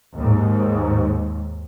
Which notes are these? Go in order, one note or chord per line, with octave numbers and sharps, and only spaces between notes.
D#2 G#2